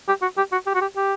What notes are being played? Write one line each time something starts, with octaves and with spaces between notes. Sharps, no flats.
G4
F#4
G4
F#4
G4
F#4
G4
G4